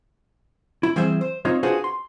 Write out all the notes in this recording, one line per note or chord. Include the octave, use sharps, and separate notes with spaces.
E4
E3 G3 C4 G#4 C5 E5
C5
C4 D#4 F4 C5 C#5
D4 F4 F#4 G#4 B4 C5
C6